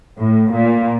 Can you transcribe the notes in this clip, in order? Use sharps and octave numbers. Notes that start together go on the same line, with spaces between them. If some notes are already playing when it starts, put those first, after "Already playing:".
A2
A#2